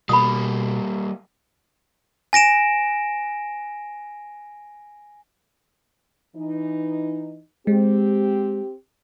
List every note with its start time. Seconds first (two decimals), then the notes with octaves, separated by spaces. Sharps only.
0.09 B2 G3 A#3 B5 D#6
2.33 G#5 A#6 D7 E7
6.36 E3 D#4
7.67 G#3 C4 G4